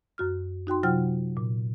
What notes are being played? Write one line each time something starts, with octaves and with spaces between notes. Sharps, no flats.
F#2 F#4 F6
D#4 F#4 G5 C6
C3 F#3 F4 F#5 G5 F6
A#2